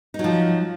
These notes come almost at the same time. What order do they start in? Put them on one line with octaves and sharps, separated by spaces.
D#4 F#3 F3